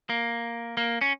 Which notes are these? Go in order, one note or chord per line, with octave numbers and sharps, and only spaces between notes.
A#3
A#3
C#4